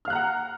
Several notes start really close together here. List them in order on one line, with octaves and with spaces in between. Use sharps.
F6 F5 F#6 A#5 F#5